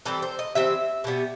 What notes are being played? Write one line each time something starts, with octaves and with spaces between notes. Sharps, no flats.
E3 G3 C4 A4
C5
D#5
E3 G3 C4 E5
B2 G3 B3